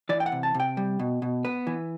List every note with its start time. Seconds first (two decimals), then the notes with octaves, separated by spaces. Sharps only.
0.09 E3 D5
0.20 G5
0.26 F#5
0.32 C3
0.43 A5
0.54 C3
0.60 G5
0.77 G3
0.99 B2
1.22 B2
1.45 B3 B4
1.67 E3